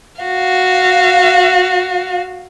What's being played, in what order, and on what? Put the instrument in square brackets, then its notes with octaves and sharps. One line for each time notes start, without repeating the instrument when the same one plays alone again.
[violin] F#4 F5